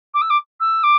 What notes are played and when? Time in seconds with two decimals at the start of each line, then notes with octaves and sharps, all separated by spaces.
0.14 D6
0.21 E6
0.30 D6
0.60 E6
0.83 D6